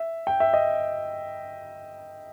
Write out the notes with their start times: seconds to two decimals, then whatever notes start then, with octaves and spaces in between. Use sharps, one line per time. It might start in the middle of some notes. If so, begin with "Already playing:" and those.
Already playing: E5
0.27 G5
0.40 E5
0.53 D#5